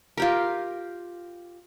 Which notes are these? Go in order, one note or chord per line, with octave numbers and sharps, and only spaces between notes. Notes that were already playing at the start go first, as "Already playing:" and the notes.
F4 G4 A#4